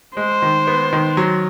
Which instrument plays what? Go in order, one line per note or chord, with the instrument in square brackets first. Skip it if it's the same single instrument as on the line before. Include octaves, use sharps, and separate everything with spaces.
[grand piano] G#3 [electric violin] C5
[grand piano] D#3
B3
D#3
F#3